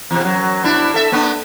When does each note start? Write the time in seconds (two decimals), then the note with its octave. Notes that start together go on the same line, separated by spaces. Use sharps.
0.11 E2 C3
0.24 F#2 F#3
0.64 B2 D4 E4
0.94 A4 E5
1.12 A#3 B3 D4